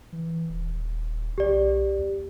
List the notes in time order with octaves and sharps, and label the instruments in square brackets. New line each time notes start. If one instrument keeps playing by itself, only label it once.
[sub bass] E3
D#1
[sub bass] B1 [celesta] G4 D5
[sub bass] D#2